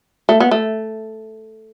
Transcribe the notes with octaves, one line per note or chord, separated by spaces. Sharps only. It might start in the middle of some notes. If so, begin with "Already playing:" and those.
A3
B3
A3